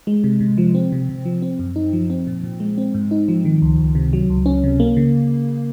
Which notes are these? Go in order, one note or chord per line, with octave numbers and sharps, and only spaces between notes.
G#3
C3
C3
F3
C4
C3
C3
F3
C4
F#2
D#4
F3
C4
A#2
A#2
G#3
C4
G#2
D#4
F3
D#3
C#2
C#2
C3
F#3
C#2
C#4
C3
A#3
C#3